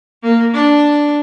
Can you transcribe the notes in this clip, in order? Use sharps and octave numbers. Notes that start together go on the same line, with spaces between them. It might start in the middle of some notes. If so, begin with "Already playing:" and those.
A#3
D4